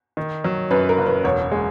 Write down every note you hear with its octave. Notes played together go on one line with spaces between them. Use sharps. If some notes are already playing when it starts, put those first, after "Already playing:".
D#3
F#3
F#2 B4
A#4
F#1
B4
E1 C#5
G#3